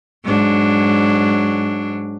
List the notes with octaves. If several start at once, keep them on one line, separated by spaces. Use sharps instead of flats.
G#2 F#3 D4